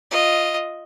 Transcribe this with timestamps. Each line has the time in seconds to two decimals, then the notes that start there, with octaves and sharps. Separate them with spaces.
0.11 F4 D#5